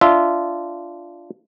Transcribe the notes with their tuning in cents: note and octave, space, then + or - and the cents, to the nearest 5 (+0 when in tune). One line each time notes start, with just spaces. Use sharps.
D4 -10 F4 -15 E5 -10